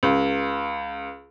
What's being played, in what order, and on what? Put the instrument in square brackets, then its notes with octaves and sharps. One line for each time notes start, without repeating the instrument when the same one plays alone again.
[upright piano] C#2